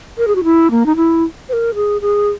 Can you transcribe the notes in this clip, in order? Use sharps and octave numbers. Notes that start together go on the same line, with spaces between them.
A#4
G#4
F#4
E4
A#3
D#4
E4
C5
A#4
G#4
G#4